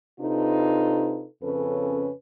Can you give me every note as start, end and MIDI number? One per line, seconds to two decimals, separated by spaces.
0.20 1.25 48
0.20 1.25 62
0.20 1.25 63
0.20 1.25 65
0.20 1.25 69
0.20 1.25 71
1.42 2.11 41
1.42 2.11 49
1.42 2.11 61
1.42 2.11 69
1.42 2.11 71